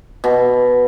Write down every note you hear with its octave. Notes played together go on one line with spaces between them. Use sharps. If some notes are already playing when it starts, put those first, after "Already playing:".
B2